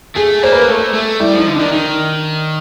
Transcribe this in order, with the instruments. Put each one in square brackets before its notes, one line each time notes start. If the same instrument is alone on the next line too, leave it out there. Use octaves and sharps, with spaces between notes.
[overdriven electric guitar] A3 [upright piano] G#4
[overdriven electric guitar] A#3 [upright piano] C5
[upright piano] B4
A#4
[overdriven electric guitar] A3 [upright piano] A4
[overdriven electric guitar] A3
[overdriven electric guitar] G3 [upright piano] E4
[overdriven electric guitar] F3
[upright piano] D#4
[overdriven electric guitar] D3
[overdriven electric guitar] D#3 [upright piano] D4
[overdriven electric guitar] D#3 [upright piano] D#4